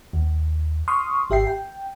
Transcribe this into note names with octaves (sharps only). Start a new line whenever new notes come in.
D#2
C6 C#6 D#6 F6
G#1 G4 E5 G5 C7
G5